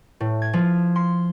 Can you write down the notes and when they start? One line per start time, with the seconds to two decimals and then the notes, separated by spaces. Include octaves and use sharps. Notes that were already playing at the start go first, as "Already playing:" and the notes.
0.20 A2
0.42 G#6
0.53 F3
0.96 C6